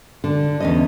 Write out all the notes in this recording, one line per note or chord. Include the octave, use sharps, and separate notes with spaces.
D3
E2 C#4 D#5